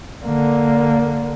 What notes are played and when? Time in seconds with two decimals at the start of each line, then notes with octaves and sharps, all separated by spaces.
0.25 D3 A#3